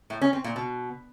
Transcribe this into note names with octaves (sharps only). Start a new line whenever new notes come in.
A2
C#4
C4
A#2
B2